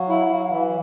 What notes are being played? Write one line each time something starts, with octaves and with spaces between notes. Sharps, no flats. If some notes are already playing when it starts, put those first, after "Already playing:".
Already playing: F#3 F5
E4
F#3
E3